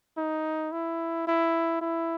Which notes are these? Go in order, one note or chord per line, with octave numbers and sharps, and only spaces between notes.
D#4
E4
E4
E4